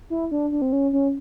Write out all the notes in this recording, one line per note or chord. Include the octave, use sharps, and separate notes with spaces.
E4
D4
D4
C4
C#4
C#4